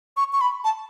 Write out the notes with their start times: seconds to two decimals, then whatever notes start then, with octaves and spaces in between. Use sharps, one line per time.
0.17 C#6
0.33 C#6
0.41 B5
0.64 A5